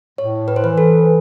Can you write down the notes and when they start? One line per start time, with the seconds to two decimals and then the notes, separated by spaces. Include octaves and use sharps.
0.18 A2 C#5
0.48 B4
0.56 C5
0.63 E3 B4
0.78 A4